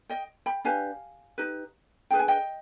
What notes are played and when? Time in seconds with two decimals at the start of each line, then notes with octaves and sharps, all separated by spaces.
0.10 D#5 G5
0.46 G5 B5
0.65 D4 G4 B4 F5 G#5
1.38 D#4 G4 B4
2.11 D4 G#4 B4 G5
2.19 G#5
2.28 D#5 G5